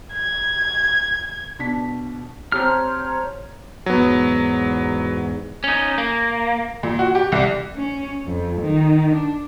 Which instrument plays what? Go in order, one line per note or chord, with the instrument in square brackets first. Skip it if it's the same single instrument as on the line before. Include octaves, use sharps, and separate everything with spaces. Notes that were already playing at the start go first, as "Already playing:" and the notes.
[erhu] G#6
[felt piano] B2 D4 B6
[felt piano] C4 G4 A5 [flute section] C5 C#5 A#5 [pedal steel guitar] F6
[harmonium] E2 G#2 [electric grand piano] F#3 B3
[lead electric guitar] C#4 D#4
A#3
[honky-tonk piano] A#2
F#4
G4
C2
[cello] C#4
F2
D#3
D4